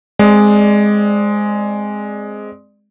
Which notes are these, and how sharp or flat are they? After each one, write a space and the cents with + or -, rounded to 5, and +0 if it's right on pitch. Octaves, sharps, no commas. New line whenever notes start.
G#3 +0 C4 +0 D5 +15